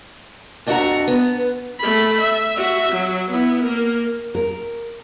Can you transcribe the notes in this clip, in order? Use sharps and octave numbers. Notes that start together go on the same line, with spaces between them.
F2 D4 F#4 E5 F#5 A#5
B3
A3 B5
E5
F#4 E5
F#3
B3 E4
A#3 A#4
A#4